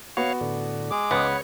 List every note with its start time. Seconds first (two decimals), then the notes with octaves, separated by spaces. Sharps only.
0.17 B3 F#4 C#5 F5
0.41 A2 D3
0.91 G#3 G#4 D6
1.11 C#2 B3 C#5